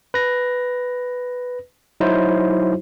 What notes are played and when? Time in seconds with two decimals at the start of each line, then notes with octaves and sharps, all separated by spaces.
0.14 B4 A#6
2.00 F#3 D#4 E4 F#4 C5